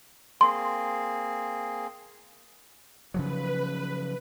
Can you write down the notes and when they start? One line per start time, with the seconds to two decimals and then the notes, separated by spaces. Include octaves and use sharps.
0.41 A#3 C4 G#4 C6
3.14 C#3 F3 F#3 B4